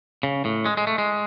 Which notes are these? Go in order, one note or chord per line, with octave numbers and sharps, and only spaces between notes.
C#3
A2
G#3
G#3
A3
G#3